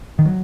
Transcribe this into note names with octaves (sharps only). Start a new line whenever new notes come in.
D#3
F#3